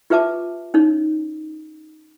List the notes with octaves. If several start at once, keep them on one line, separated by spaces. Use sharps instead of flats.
F4 G4 B4 E5 A5 D6
C#4 D#4 C#5